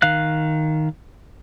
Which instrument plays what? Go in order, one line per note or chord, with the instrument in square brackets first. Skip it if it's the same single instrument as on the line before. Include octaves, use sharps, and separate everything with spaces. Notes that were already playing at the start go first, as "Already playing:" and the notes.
[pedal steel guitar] D#3 F5 F#6